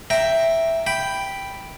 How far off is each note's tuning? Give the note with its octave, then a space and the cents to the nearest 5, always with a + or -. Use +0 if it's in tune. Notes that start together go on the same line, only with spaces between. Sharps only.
E5 +0 G5 +0 A#5 +0
G5 +0 B5 +0